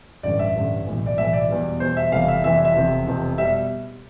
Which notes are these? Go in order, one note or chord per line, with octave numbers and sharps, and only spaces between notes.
A1 G2 D3 G3 D5
E5
A1 G2 D3 G3
B1 A2 E3
D5
B1 A2 E3 E5
D5
E2 B2 G3
E2 B2 G3 C5
E5
F1 F2 E3 G3 F5
F5
E5
F1 F2 E3 G3 E5
E5
F1 E2 C3 F3
F1 E2 C3 F3
B2 G3 E5